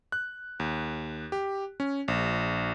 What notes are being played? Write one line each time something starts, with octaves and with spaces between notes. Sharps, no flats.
F#6
D#2
G4
C#4
A#1